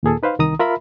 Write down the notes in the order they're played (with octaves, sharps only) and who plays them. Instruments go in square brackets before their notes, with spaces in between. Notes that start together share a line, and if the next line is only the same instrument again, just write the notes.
[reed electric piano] D#2 A#2 G#4 A4
D#4 B4 C5 F5
C2 D#3 A#5 D#6
F4 A#4 E5 B5